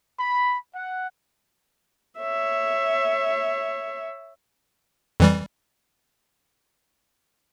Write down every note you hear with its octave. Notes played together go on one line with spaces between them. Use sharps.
B5
F#5
C#5 E5
F2 E3 G3